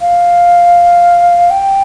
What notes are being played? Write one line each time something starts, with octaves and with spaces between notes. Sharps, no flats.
F5
G5